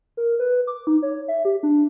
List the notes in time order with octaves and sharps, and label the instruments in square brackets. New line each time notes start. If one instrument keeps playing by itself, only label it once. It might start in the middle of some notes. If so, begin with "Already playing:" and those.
[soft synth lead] A#4
B4
D6
D#4
C#5
E5
G4
D4